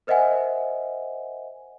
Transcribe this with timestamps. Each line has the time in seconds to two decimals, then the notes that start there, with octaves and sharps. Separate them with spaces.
0.07 A#4 C5 D#5 E5 F#5 G#5